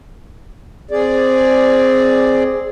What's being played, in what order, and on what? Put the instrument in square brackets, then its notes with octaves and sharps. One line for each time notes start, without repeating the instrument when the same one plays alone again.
[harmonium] C4 G#4 D5